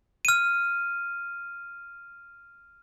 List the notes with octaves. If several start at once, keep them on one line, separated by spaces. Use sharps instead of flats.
F6 D#7